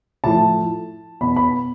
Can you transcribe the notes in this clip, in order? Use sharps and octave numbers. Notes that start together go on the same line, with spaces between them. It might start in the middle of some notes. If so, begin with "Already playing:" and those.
A2 F3 A3 A5
B2 B3 B5
B5